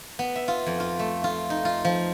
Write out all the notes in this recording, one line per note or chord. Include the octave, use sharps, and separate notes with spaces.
B3
E5
F4
F2
F4
A3
F4
D#4
F4
F3